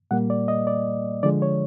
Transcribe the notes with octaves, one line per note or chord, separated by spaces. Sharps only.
A#2 G3 A#3 F#5
D5
D#5
D5
D3 F3 G#3 D5
C#5